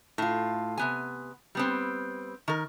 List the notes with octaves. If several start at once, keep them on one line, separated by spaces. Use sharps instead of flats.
A2 F4
C3 B3 G#5
G3 B3 C4
D#3 A#4